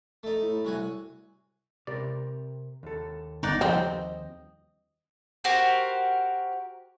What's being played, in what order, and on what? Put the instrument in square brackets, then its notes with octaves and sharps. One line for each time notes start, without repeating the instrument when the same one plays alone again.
[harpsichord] A3 D#4
[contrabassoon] A2
[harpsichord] C2 F#4 G#5
[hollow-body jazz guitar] C3 G4 A#4 [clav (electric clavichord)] D5
[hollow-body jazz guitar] D#2 A4
[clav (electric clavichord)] G1 [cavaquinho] D#4 D5 F#5
[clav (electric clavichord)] F3 G3 D#4 [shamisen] C4 [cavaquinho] D#5
[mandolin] F#4 G4 A#4 C5